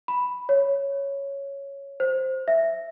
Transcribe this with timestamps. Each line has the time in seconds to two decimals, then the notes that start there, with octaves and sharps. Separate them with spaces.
0.08 B5
0.49 C#5
2.00 C5
2.48 E5